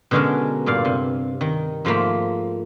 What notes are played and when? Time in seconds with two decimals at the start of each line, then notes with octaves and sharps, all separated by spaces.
0.11 B2 D3 G#3 C#4 D4 A#4
0.66 G2 A#2 D5 F5
0.85 C3
1.41 D#3
1.85 G#2 F3 A3 A#3 B5